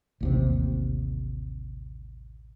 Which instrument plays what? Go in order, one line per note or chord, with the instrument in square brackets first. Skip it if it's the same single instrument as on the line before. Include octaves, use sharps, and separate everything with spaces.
[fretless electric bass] A1 D#2 C3